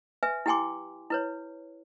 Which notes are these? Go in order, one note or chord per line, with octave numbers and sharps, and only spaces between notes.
B4 E5 G#5
E4 G4 G5 G#5 C6 D6
E4 B4 C#5